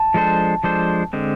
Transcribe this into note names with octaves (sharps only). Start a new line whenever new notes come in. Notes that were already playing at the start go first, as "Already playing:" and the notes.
Already playing: A5
F3 G#3 D4 A4 C5
F3 G#3 D4 A4 C5
D3 G#3 C4